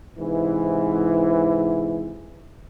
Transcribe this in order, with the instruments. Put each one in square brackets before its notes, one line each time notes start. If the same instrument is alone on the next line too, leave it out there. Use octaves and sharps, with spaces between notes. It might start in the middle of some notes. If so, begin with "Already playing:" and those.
[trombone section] G#2 C3 E3